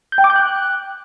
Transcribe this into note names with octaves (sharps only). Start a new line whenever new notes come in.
G6
G5
D6
G6
F#6